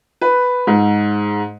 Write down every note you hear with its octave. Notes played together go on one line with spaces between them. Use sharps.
B4
G#2